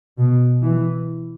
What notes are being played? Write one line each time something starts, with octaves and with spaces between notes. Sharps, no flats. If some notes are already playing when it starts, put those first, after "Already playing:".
B2
E3